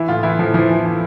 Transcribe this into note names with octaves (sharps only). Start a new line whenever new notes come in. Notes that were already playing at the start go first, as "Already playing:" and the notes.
Already playing: E3 E4
A2 F4
E3 E4
A2 F3
E3 F3
E3
E3